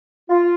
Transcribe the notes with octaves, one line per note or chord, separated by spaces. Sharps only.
F4